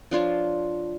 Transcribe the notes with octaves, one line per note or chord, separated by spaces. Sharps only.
F3 D4 F4 C#5